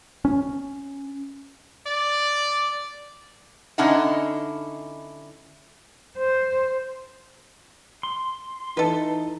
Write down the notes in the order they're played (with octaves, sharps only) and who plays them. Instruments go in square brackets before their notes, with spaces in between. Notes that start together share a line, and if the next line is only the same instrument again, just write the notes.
[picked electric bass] C#4
[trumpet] D5
[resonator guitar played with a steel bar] D3 C#4 D#4 E4 D#5 F#5
[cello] C5
[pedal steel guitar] C6
[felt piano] E3 [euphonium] D#4 [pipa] A4 B4